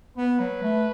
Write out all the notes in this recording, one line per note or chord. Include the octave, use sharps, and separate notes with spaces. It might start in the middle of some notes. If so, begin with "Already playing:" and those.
B3 B4
F#3
A3